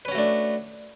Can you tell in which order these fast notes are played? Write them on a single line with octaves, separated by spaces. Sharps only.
B4 C#4 F#4 A3 D4